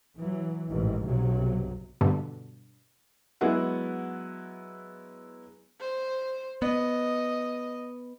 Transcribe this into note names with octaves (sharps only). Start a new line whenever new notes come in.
E3 F#3
A1 G#2 D#3 E3
B1 G2 C3 F#3
G2 B2 D3
F#3 G#3 B3 E4 F#5
C5
B3 D#5